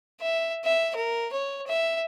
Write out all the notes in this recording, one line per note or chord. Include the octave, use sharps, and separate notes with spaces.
E5
E5
A#4
C#5
E5